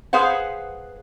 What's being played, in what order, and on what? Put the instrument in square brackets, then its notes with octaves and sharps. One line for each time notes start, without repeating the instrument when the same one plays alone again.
[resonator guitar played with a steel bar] G#4 B4 C5 F5 F#5